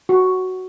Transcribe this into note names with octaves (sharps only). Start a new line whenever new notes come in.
F#4